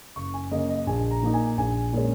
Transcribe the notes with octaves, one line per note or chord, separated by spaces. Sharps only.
F#1 C#6
G#5
F#2 C#3 A#3 D#5
D#5
A#1 G#5
A#5
A#2 A#3 D#4
G#5
A#1 G#5
A#2 G#3 C#4